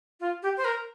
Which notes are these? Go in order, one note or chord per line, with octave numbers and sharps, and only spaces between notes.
F4
G4
C5
A#4